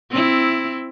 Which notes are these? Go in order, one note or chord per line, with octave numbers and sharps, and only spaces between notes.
C4 E4